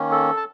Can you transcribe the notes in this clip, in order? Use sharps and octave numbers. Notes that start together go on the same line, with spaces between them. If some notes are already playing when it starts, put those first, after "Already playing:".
Already playing: D#3 A#3 C#4
A4
A5